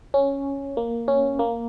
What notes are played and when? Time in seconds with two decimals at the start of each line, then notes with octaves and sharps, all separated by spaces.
0.14 C#4
0.77 A#3
1.08 C#4
1.39 A#3